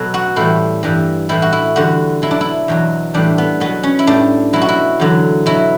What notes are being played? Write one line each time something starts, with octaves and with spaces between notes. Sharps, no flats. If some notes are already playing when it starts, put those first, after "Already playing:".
Already playing: B2 F#3 A4
F#4
A2 E3 G3 E4
G2 E3 G3
A2 E3 G3 E4
F#4
E4
E2 D3 G3 F#4
B2 F#3 E4
D4
E4
E2 B2 F#3
A2 E3 G3 D4
B3
B2 F#3 B3
C#4
E4
A2 G3 D4
B2 F#3 E4
F#4
E4
E2 D3 F#3
B2 F#3 E4